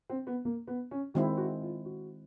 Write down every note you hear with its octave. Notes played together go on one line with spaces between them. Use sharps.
C4
B3
A#3
B3
C#4
D#3 G#3 C4 E4 F#4
F#4
F4
F#4